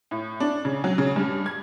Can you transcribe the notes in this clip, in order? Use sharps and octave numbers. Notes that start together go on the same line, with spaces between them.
A2
D4
C#3
F#3
C#3
G2
G#6